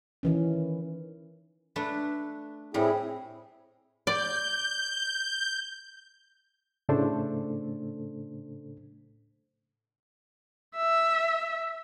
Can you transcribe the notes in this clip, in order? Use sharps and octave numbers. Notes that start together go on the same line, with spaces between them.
D#3 E3 C#4
A3 D4 B4
A2 G3 C4 E4 G#4
D5 G6
A2 C#3 A3 D4 A4 C5
E5